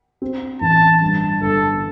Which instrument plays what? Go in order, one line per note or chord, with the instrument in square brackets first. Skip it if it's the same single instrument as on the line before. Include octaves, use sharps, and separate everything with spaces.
[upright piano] C4
[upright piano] A1 [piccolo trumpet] A5
[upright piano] G2 [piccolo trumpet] A5
[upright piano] G1 [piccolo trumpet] A4